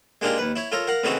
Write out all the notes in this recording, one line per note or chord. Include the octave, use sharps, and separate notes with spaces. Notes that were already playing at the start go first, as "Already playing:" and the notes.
G#3 A#3 D4 D#4 F4 G4
D#2 B4
E4 C#5
F4 A4 A#4 C#5
A#4 F5 F#5
A2 C#3 E3 C4 D#4 F#4